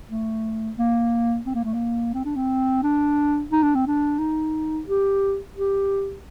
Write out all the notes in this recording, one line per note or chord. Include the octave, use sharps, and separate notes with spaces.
A3
A#3
C4
A#3
A3
A#3
C4
D4
C4
D4
D#4
D4
C4
D4
D#4
G4
G4